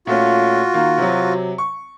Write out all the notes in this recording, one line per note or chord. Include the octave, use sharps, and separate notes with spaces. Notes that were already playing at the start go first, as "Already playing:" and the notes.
A#2 A3 C#4 F4 F#4
D#3 A#3
C3 F#3
C#6